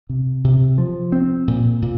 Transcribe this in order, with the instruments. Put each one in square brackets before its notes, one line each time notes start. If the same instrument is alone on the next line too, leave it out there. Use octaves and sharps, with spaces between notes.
[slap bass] C3
C3
F3
C4
A#2
A#2